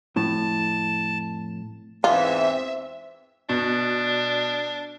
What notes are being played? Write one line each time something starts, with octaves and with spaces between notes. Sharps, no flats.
F2 A2 A5
E2 G#2 E3 C4 F4 E5
B2 D4